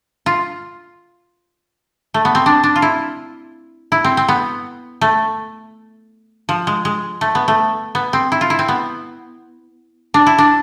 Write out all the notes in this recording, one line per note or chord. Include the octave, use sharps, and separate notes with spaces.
F4
A3
B3
C4
D4
D4
F4
E4
E4
C4
C4
B3
A3
F3
G#3
G#3
A3
B3
A3
B3
C4
E4
F4
E4
C4
B3
D4
E4
D4